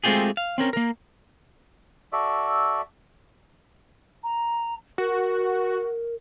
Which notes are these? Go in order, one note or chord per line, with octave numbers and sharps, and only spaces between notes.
G#3 A3 C4 F4 G4 G#4
F5
C4 C#4 A#4
A#3 A#4
F#4 A4 D5 E5
A#5
F#4 A#4